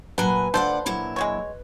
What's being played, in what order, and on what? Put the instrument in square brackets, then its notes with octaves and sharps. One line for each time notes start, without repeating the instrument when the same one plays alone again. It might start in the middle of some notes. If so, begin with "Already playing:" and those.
[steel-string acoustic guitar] A#2 F#3 G#5 [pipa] D4 F#5 [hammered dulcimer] B4
[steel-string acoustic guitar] D2 D5 F#5 [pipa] F3 A4 C5
[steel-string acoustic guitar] A#2 F#3 E4
[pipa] G#3 F#4 C#5